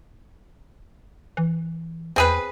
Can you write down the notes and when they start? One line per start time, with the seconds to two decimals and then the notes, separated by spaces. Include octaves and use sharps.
1.37 E3
2.16 E2 C4 G#4 B4